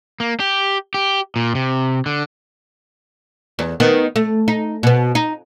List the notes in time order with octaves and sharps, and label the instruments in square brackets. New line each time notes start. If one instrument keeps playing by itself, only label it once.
[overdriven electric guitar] A#3
G4
G4
A#2
C3
D3
[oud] E2
D#3 B3
A3
D#4
B2 B3
D#4